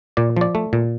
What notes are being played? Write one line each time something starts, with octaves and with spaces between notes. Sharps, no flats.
A#2 D5
F3 D5
A3
A#2